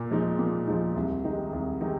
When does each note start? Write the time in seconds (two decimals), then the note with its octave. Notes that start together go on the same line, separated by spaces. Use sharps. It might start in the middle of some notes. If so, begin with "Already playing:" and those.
Already playing: A#2
0.11 F3 G#3 D#4
0.39 A#2
0.67 F3 G#3 D#4
0.96 C2
1.24 C3 D#3 G#3 D#4
1.53 C2
1.81 C3 D#3 G#3 D#4